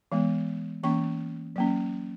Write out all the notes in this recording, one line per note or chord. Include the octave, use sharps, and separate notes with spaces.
E3 G#3 B3
E3 A#3 C#4 C#6
F#3 A#3 C#4